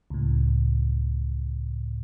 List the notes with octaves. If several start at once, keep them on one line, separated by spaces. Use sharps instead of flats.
C#2 A2